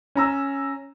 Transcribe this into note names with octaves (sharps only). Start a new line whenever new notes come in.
C#4 A#5 E6